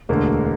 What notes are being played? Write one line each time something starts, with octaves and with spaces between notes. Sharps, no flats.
E1 D2 D3 G#3 A#3